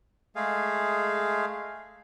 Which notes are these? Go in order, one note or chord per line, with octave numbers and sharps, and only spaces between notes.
G#3 A3 G#4 F5